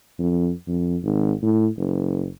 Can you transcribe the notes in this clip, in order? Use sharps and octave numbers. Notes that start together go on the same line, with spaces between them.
F2
F2
G#1
A2
F#1